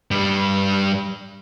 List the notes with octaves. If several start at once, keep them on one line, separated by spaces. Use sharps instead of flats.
G2 G3